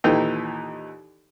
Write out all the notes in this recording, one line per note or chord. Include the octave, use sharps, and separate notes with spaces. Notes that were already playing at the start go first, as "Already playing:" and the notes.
D#2 A#2 E3 D#4 A4 G5